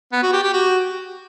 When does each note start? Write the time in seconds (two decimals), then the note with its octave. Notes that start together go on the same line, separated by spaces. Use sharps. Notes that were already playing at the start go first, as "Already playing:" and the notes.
0.12 B3
0.23 F#4
0.33 G4
0.43 G4
0.53 F#4